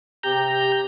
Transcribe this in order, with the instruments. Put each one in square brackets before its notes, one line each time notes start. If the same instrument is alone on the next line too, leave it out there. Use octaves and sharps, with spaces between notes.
[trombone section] C3 G4 [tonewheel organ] A#5 G6